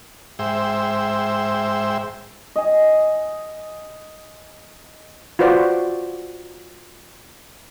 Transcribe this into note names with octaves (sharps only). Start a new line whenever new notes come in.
G#2 C5 E5 G5
D#5 G#5
F4 F#4 B4 C5 D5